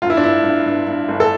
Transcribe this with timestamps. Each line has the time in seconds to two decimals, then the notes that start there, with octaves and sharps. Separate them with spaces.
0.02 G1 F4
0.10 E4
0.17 D4
0.23 G2 E4
0.44 G2
0.66 G2
0.87 G2
1.08 G1
1.20 A4